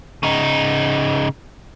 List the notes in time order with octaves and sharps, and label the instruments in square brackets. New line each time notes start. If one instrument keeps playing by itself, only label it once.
[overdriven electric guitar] C#3 D#4